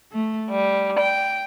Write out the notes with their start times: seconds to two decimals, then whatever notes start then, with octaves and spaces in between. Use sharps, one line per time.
0.12 A3
0.51 G3
0.98 G5